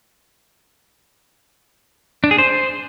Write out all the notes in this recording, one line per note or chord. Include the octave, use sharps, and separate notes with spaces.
D4
G#4
C5